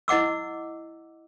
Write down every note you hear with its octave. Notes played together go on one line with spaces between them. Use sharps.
E4 D#5 F#5 D6 E6